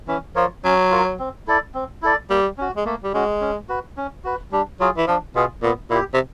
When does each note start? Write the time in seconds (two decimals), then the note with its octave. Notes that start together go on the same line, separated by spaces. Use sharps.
0.08 E3 C#4
0.36 F3 F4 A#4 C#5
0.64 F#3 C#4
0.91 F4 A#4 C#5
1.19 C4
1.47 E4 A4 D5
1.74 C4
2.02 E4 A4 D5
2.30 G3 A#3
2.58 C#4 F#4
2.77 G#3
2.85 A3 A#3
3.04 G3
3.14 G#3 C#4 F#4
3.41 C#4
3.69 F#4 B4
3.97 C#4
4.24 F#4 B4
4.52 G3 D4
4.80 F#3 F4 G#4
4.97 E3
5.07 F3 D4
5.35 B2 F4 G#4
5.62 A#2 B3
5.90 A#2 E4 G4
6.14 C3